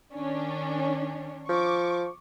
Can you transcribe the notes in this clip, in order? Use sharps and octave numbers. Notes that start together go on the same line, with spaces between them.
D#3 C#4 D4
F3 C#6 D6